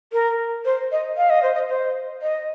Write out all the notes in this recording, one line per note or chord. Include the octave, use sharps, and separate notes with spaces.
A#4
C5
D#5
F5
D#5
C5
D#5
C5
D#5